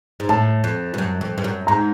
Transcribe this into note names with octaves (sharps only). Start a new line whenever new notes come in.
G#2
A2 A5
F2
G2
F#2
F2
G2
F#2
G#2 A#5